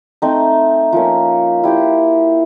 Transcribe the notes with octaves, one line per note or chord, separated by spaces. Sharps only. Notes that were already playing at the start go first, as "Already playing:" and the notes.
A3 C4 D#4
F3 A#3 C#4
E4 G4 C5